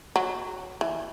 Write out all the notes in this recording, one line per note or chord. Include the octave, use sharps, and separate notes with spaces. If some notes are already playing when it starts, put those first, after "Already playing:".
F#3
E3